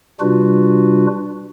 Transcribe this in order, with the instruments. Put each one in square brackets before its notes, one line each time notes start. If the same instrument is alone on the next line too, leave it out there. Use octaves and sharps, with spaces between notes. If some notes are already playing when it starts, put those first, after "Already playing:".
[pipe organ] C3 G3 D4 F4 F#4 B4